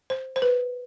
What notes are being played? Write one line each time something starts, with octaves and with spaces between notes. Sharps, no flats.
C5
C5
B4